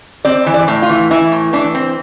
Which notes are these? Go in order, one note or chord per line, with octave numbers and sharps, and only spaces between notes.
C4 D5
E3
D5
A2
F4
E3
E3 E4
A2
E3 D4
C4